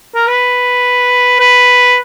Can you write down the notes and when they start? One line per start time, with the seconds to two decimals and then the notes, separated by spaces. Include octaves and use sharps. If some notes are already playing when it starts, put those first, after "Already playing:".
0.15 A#4
0.27 B4
1.39 B4